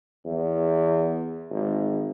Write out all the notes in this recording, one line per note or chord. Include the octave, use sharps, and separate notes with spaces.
E2
G#1